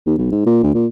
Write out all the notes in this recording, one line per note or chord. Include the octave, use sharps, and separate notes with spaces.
D#2
B1
G#2
A#2
D2
A#2